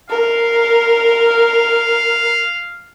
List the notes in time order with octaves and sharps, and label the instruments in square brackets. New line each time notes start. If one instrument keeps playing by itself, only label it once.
[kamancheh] A#4 [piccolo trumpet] F5